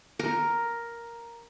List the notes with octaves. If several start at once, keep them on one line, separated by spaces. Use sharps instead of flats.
A#4